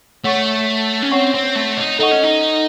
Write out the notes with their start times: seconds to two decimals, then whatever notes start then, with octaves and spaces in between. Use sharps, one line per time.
0.24 A3 C#5 F#5 C#6
1.02 C#4
1.11 C4 C#5 F#5 C#6
1.34 C4
1.55 A3
1.78 D#4
1.99 D#4 A4 D#5 F#5 C#6
2.11 C#4
2.24 D#4